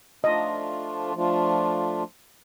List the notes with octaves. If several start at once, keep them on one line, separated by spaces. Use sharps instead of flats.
F3 A3 D4 F4 D#5
F3 A3 D4 F4